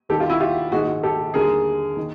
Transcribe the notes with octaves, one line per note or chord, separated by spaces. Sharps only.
D#2 D#3 G3 G4 A4
F4 G4
E4 F#4
F4 G4
A#1 G#2 D#3 F#4 G#4
G4 A4
D#2 D3 G3 G#4 A#4
D#3